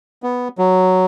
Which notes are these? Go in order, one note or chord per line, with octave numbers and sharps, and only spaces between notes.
B3
F#3